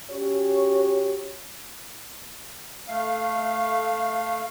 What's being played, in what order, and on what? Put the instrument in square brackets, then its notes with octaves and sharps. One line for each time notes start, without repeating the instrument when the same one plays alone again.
[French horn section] C#4 F#4 G4 C#5
[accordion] A3 F5